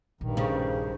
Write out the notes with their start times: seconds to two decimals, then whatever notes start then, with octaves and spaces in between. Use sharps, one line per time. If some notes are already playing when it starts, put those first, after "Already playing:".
0.21 A#1 G2 D#3
0.37 C#3 C5